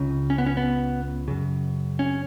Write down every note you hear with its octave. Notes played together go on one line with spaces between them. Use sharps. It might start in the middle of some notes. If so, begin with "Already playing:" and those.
Already playing: C#2 C#3
C#4
B3
C#4
B3
F#2 C#3
C#4